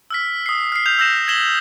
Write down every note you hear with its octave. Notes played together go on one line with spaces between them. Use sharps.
E6 F6 B6
D#6 C7
F6 C7
F6 G6 F7
E6 G6 A#6 E7
G#6 A#6 B6 E7 F#7 G7